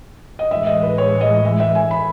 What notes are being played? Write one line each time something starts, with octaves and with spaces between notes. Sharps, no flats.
D#5
A2 E3 G#3 E5
D#5
B4
C#5
D#5
E5
E5
G#5
B5